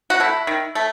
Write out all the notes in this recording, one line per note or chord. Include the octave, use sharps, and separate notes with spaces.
F#4
A3 E4
D#3
A3